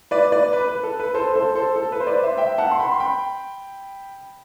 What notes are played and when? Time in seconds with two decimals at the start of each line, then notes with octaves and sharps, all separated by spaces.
0.11 B4 D5
0.32 B4 D5
0.53 B4
0.68 B4
0.83 A4
1.00 B4
1.14 A4 C5
1.36 A4 C5
1.55 A4 C5
1.76 A4
1.92 B4
2.00 C5
2.07 B4 D5
2.23 C5 E5
2.37 E5 G5
2.58 F#5 A5
2.71 C6
2.79 G5 B5
2.92 C6
3.00 G5 B5